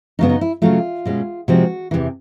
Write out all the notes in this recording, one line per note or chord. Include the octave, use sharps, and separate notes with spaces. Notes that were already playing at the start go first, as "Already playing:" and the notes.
F#2 C#3 F#3 B3 D4 D#4
D#4
E4
C#3 F#3 A3 F4
B2 G#3 C#4
C3 F3 G#3 C4 F#4
E2 C3 E3